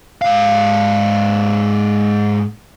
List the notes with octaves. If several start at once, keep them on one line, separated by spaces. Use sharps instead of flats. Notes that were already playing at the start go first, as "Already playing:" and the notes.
G#2 F5